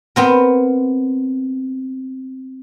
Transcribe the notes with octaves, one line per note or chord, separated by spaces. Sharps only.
B3 C4 A#4